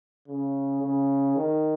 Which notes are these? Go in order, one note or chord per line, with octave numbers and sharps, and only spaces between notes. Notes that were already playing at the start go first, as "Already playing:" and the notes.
C#3
C#3
D#3